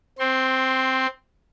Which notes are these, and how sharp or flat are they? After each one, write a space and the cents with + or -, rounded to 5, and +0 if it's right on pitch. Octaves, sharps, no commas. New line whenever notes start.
C4 +0 C6 +20